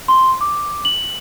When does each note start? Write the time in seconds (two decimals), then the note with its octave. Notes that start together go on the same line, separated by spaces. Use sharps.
0.08 C6
0.41 D6
0.85 F#7